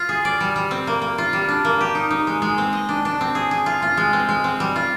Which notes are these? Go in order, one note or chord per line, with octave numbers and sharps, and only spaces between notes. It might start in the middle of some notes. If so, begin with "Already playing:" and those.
Already playing: F4
G#4
D5
G3
G3
C4
A#3
A#3
F4
G3
D4
A#3
G4
D#4
D#4
G#3
G#3
C4
D#5
D4
D4
C4
G#4
G#4
F4
F4
G#3
C4
G#3
C4
G3
F4